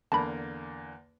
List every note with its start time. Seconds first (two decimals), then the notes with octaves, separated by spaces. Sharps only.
0.12 E2 D3 A#3 A5 B5